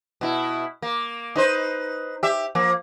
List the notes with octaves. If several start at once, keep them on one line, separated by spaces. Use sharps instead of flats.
B2 E4
A#3
D#4 B4 C5
G4 E5
F3 A#3